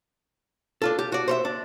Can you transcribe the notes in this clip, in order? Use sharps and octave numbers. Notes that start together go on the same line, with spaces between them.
D4 F4 A4
G4
F#4 D5
C5 C#5 E5
D4